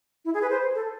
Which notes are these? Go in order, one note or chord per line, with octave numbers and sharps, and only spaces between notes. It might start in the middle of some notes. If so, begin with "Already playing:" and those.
E4
G#4
B4
C5
A4